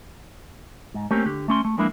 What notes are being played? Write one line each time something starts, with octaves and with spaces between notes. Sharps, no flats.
G#2
A3 A#3 C4 C#4 G4 A#4
D3 G4
A3 C#4 C6
A3
F3 G#3 A#3 B3 D4 E4